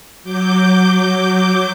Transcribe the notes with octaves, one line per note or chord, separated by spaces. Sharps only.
F#3 D6 G6